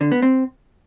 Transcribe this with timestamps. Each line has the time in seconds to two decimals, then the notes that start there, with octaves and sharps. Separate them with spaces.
0.01 D3
0.12 B3
0.22 C4